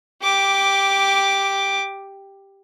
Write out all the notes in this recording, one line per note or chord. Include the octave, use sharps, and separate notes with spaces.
G4 D6